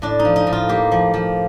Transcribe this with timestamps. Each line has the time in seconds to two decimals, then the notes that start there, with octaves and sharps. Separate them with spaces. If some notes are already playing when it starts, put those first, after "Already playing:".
0.02 A2 D4
0.19 D#4
0.25 F3
0.36 D#4
0.47 A2
0.53 F4
0.69 A#3 G4
0.91 F3
1.14 F3